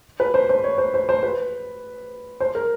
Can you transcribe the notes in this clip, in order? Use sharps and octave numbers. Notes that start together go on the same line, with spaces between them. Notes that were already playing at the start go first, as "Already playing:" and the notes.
B4
C5
C5
C#5
C5
C5
C5
B4
C5
A#4